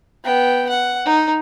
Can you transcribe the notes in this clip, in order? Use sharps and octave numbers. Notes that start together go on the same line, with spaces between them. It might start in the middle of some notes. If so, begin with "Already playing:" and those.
B3 G5
F#5
D#4